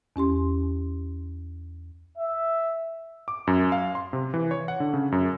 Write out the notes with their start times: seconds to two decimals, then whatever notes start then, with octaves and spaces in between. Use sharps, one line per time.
0.16 E2 C#4 G4 C6
2.17 E5
3.28 D6
3.47 F#2
3.72 F5
3.95 C6
4.13 C3
4.34 E3
4.51 C#5
4.68 F#5
4.80 D3
4.94 C#3
5.12 F#2